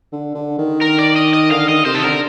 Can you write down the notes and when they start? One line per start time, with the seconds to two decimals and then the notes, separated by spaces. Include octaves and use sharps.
0.12 D3
0.35 D3
0.58 D#3
0.82 A#4
0.99 D5
1.16 D#5
1.34 D#5
1.51 D3 F5
1.68 D#3 D#5
1.85 C3 C5
1.95 A4
2.03 D3 A#4